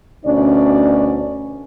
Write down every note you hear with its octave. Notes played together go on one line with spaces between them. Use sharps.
D2 B2 C#4 D4 D5